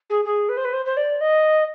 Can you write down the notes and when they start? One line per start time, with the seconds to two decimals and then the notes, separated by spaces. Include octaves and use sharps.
0.10 G#4
0.25 G#4
0.49 B4
0.57 C5
0.65 B4
0.73 C5
0.85 C5
0.97 D5
1.21 D#5